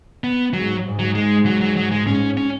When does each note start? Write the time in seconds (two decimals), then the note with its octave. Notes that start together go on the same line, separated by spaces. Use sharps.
0.24 B3
0.54 G#2 F#3
0.85 G#2
0.99 F#3
1.15 G#3
1.46 F#3
1.61 F#3
1.76 F#3
1.92 G#3
2.07 G#2 C#4
2.37 C#4